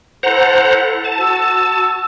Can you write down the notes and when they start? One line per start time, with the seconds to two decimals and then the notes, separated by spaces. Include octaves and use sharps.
0.23 E4 A4 C5 F#5 A#5
1.04 A5
1.16 F#4 E6